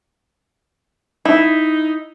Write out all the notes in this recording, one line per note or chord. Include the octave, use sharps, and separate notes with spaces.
D#4 E4